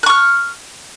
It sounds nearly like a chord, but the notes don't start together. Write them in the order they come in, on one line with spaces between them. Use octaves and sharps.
F#6 C#6 F6